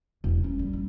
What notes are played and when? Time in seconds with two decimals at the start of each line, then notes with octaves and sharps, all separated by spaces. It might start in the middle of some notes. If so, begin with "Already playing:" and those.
0.24 E1
0.44 C#4
0.59 G3
0.73 D#4